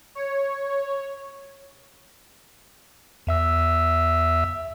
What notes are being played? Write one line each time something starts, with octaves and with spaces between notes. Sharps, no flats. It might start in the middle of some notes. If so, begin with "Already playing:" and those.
C#5
E2 E5 E6